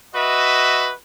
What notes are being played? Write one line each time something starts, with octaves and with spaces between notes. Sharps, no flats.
F#4 B4 D#5 E5